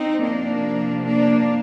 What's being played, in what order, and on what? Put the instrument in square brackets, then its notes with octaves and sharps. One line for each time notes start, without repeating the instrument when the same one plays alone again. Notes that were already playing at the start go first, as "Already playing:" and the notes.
Already playing: [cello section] C4 D#4
C3 F3 A#3 D4
A#3 D4